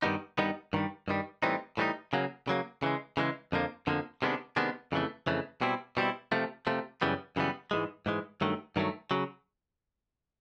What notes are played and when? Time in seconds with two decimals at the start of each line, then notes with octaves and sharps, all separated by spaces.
0.02 G2 D#3 G3 B3 D#4
0.38 G2 D#3 G3 B3 D#4
0.73 G2 D#3 G3
1.08 G2 D#3 G3
1.43 A2 E3 G3 C4 D#4
1.77 A2 E3 G3 C4 D#4
2.13 C#3 F#3 A#3
2.47 C#3 F#3 A#3
2.83 C#3 E3 G#3
3.17 C#3 E3 G#3
3.52 F2 D3 F3 A#3
3.87 F2 D3 F3 A#3
4.22 C3 D#3 G#3 B3 D4
4.56 C3 D#3 G#3 B3 D4
4.92 F2 C#3 E3 A3
5.27 F2 C#3 E3 A3
5.61 B2 G3 C4 E4
5.97 B2 G3 C4 E4
6.32 C3 F3 A3
6.67 C3 F3 A3
7.01 F#2 C#3 E3 G3 B3
7.36 F#2 C#3 E3 G3 B3
7.71 G#2 E3 G#3
8.06 G#2 E3 G#3
8.41 G2 D#3 F#3 A3
8.76 G2 D#3 F#3 A3
9.11 C#3 F#3